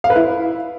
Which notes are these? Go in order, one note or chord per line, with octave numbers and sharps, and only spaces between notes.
F5
B4
E4